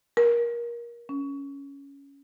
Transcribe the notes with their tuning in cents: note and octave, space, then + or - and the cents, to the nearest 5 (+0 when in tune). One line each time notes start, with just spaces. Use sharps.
A#4 +20
C#4 +10